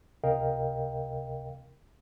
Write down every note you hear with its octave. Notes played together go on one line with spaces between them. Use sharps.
C#2 C3 A#4 D#5 F5 G5